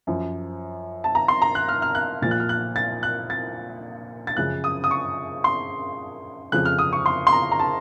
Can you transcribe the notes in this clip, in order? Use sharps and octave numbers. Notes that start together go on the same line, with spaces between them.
F#2 F3
A5
A#5
C6
A#5
F#6
F6
F6
F#6
A#2 F3 A6
F#6
F6
F#6
A6
F#6
A6
A6
F#2 C#3 F3 F#6
D#6
D#6
C#6
C6
F2 C#3 F3 F#6
F6
D#6
C#6
C6
C6
A#5
A#5
A5